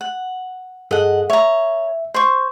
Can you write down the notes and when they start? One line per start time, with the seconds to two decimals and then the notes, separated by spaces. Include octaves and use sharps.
0.01 F#5
0.91 G2 G#4 A4 D#5 F#5
1.30 C#5 E5 A#5
2.14 C5 C#6